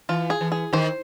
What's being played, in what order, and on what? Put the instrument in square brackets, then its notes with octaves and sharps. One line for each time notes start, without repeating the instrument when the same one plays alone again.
[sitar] E3 [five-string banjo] F4
[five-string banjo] G#4
[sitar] E3
[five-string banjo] G#4
[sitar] D#3 [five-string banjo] C5